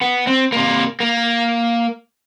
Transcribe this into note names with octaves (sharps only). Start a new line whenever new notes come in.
B3
C4
C3 A#3
A#3